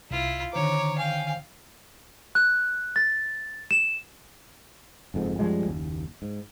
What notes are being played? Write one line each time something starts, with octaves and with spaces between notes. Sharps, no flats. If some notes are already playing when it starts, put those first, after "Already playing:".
C2 E4 F4
D3 D#3 C5 C#5 A#5 D6
F5 G5 G#5
F#6
A6
E7
F#1 F2 G#2
F#2 F3 G3 G#3
F#1 D#2
G#2